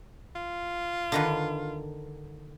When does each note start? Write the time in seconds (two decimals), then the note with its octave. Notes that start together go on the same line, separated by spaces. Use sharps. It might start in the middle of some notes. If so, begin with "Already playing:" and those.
0.36 F4
1.12 D3 D#3 B4